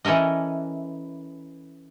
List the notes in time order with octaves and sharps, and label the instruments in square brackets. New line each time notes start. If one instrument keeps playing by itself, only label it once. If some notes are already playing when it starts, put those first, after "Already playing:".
[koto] E3 C#4 A4 A#4 D#5